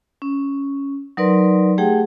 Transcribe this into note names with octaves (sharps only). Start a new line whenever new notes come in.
C#4
F#3 D#4 A#4 B4 D5 C6
A3 G4 G#4 F#5 G5